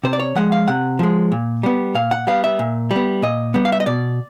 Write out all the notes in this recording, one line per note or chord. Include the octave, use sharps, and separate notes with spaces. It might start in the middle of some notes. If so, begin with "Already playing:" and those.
C3 C5
D5
C#5
F3 G#3 F#5
F5
C3 F#5
F3 G#3
A#2
G3 B3
A#2 F5
F#5
G3 B3 F5
E5
A#2
G3
B3
A#2 D#5
G3 B3
F5
E5
D#5
B2 D5